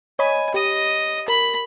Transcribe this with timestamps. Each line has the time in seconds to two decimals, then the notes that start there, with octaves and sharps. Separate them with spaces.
0.19 C#5 D#5 G#5 B5
0.54 G4 D#5 D#7
1.28 A#4 B5